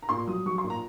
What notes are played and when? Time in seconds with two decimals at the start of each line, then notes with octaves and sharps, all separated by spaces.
0.02 A#5
0.09 A#2 C6
0.27 F#3 D#6
0.45 F#3 C#6
0.58 C6
0.64 A#2
0.70 A#5